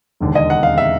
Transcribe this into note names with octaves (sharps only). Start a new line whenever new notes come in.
E1 D#2 D3
D#5
F#5
F5
E5